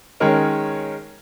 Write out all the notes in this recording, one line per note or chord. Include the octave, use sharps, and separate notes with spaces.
D#3 G#3 C#4 A#4 C#5